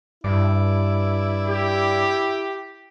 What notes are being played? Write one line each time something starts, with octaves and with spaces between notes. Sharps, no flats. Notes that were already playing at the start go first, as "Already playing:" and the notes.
G2 E4 D5
G4